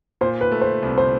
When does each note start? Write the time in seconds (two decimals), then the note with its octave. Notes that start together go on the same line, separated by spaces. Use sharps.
0.21 A#2 C5
0.41 B4
0.52 A3
0.61 C5
0.82 C2
0.98 C5